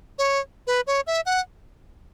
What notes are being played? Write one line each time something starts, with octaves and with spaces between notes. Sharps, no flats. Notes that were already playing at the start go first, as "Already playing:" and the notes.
C#5
B4
C#5
E5
F#5